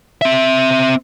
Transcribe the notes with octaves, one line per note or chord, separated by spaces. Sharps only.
C4 E5